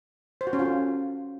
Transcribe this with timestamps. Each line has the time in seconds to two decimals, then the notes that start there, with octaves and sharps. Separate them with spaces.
0.41 C5
0.47 F#4
0.53 C#4
0.59 F4
0.65 A4